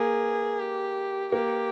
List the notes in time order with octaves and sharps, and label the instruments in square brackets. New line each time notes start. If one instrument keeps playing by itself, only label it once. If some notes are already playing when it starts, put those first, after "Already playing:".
Already playing: [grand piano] A#3 [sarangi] G#4
[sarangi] G4
[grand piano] A#3 [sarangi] G4